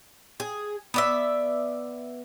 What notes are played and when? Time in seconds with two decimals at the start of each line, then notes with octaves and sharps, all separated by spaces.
0.40 G#4
0.94 B3 D5 E5